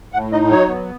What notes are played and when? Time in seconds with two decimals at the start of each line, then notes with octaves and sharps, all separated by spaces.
0.13 A2 F#5
0.32 D#4 D#5
0.50 F#3 C#5
0.69 B3